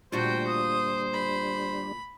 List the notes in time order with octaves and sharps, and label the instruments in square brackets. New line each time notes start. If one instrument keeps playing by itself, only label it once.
[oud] D2 A#2 F4 [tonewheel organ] G3 D4 [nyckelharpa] F#4 G5 [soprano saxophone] C5
[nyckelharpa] D#6
B5